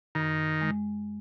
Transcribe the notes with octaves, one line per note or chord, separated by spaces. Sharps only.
F#2 D#3
G#3